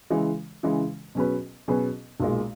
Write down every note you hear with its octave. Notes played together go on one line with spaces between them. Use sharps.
C#3 E3 G#3
C#3 E3 G#3
B2 F#3 C#4 G#4 B4
B2 F#3 C#4 G#4 B4
B1 A#2 G#3